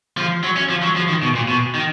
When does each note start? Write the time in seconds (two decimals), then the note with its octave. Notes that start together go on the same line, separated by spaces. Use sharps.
0.18 F3
0.44 F#3
0.57 C#4
0.70 F3
0.83 F#3
0.96 F3
1.09 D#3
1.23 B2
1.35 A#2
1.48 B2
1.75 D#3